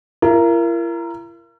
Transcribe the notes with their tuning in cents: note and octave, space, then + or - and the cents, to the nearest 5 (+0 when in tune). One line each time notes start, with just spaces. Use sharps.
E4 +45 A#4 +0